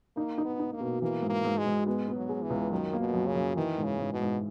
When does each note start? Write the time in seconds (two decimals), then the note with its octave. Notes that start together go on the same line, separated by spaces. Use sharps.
0.16 A#3 D#4
0.38 D#4
0.45 B3
0.59 D#4
0.73 A#3
0.81 B2
1.02 E3 A#3
1.22 G#2
1.30 A#3
1.44 G#2
1.58 G#3
1.66 G#2
1.86 G#3 B3
2.08 B3
2.15 F#3
2.29 G#3
2.43 E3
2.50 C#2
2.71 F#2 D#3
2.93 A#3
3.00 B2
3.14 F#2
3.28 C#3
3.36 F#2
3.56 D#3 E3
3.78 G#2
3.84 C#3
3.99 G#2
4.13 B2
4.21 G#2